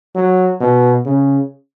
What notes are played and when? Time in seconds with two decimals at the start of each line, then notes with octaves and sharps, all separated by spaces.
0.15 F#3
0.60 B2
1.06 C#3